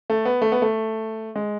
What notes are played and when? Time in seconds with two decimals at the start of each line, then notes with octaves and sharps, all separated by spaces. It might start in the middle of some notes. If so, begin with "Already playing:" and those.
0.10 A3
0.25 B3
0.42 A3
0.52 B3
0.62 A3
1.36 G#3